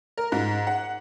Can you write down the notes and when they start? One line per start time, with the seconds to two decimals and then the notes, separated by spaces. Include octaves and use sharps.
0.18 A#4
0.32 G#2
0.67 F#5